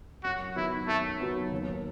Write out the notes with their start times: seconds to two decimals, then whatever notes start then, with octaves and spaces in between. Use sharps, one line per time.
0.24 F#2 F#4
0.56 D#3 F#3 B3 E4
0.87 F#2 A3
1.20 D#3 F#3 B3
1.52 D#2